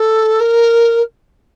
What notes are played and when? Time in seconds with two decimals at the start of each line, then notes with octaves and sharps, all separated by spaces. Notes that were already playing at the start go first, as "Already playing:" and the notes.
Already playing: A4
0.40 A#4